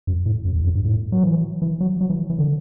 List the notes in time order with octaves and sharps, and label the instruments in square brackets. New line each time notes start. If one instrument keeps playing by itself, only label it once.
[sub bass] F#2
A2
F#2
E2
F#2
G2
A2
F#3
E3
E3
F#3
F#3
E3
E3
D3